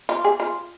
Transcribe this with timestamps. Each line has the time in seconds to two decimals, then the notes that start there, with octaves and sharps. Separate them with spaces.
0.09 F4
0.24 G#4
0.40 F4